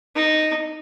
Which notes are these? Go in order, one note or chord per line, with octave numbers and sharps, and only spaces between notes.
D#4